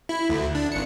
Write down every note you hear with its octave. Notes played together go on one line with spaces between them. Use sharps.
E4
D2
D4
G#1 C#7